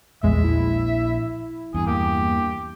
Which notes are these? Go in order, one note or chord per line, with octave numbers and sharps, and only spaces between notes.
A#1 E2 G#3 E5
E4
E2 G2 G#4
A#3 G4